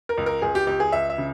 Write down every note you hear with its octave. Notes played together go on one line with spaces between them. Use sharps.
A#4
C#2
A#4
C#2 G#4
G4
C#2 G4
G#4
C#2 E5
E5
C#3